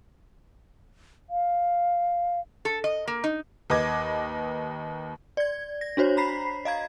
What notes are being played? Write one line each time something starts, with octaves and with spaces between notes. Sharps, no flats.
F5
A4
D#5
A#3
D#4
D#2 B4 D#5 D6 G#6
D5 G#6
A#6
D4 F#4 C5 C#5
A#5 B5 B6 C7
D#5 F5 A#5 G#6